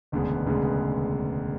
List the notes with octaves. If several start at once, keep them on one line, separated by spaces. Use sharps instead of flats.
E1 D2 C#3 G#3 B3
E1 D2 C#3 G#3 B3